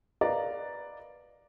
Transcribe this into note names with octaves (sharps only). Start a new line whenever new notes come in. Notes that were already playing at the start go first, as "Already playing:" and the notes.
A#4 B4 D5 D#5 F5 A#5